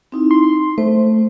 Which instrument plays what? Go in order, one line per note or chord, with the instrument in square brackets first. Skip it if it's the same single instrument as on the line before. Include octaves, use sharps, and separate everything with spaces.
[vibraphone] C4 D#4 E4
[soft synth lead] C6
[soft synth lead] A3 [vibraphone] C5